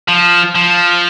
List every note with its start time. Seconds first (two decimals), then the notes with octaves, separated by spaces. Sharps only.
0.08 F3
0.55 F3